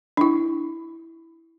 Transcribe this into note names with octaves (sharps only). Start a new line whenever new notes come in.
D4 E4